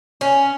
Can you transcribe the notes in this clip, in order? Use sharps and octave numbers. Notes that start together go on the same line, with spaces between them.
C#4